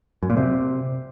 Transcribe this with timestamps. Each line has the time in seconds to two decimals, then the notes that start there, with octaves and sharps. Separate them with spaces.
0.23 F#2
0.30 A#2
0.37 C3